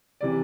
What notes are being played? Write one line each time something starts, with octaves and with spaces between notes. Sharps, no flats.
C3 E3 D5